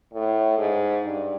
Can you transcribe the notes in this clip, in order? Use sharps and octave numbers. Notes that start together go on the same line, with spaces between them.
A2
G#2
G2